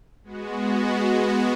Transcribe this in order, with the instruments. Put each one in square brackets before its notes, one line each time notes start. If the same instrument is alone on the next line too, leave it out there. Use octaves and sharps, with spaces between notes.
[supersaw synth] G#3 B3 F#4